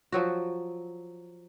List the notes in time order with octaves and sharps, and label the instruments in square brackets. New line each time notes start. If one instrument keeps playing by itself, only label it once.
[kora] F3 F#3 F#4